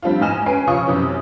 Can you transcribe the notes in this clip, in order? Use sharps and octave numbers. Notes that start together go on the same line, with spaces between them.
G3 C4 D4 F4
G#2 E3 D#5 G#5 F6 E7
C#4 B4 G#5 C7 D7
C#3 F3 C#5 F5 C#6 D#6
F#2 C3 E3 C#4